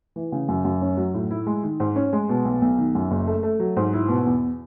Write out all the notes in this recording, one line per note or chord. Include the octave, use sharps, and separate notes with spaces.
E3
C#3
F#2
F#2
C#4
F#3
A2
E4
G#3
D#3
G#2
C#4
G#3
B2
B1
B1
D#3
F#2
F#1
A3
A3
F#3
G#2
E4
B2
E2